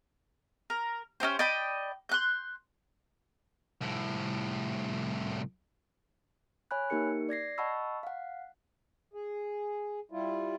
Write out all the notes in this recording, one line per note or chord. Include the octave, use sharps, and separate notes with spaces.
A#4
C#4 D#4 G4 C5
D5 D#5 G5 B5
C6 F#6 G6
C2 A2
C#5 G#5 B5 F#6
A#3 D#4 G4 A#4 C#7
D5 G#6 A#6 C7
D#5 F#5 A5 B5 C#6 E6
F5 F#5
G#4
G3 E4 F4